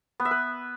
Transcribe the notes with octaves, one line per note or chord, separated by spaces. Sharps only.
B3
E5
B4